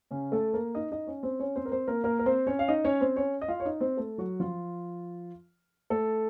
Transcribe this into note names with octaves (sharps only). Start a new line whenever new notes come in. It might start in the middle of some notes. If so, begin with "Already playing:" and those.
C#3 C#4
A3 A4
A#3 A#4
D#4 D#5
D#4 D#5
C#4 C#5
C4 C5
C#4 C#5
C4 C5
A#4
C4 C5
A#3 A#4
A#3 A#4
A#4
C4 C5
C#4 C#5
F5
D#4 D#5
C#4 C#5
C4 C5
C#4 C#5
D#5
F4 F5
C#5
D#4 D#5
C4 C5
A3 A4
F#3 F#4
F3 F4
A3 A4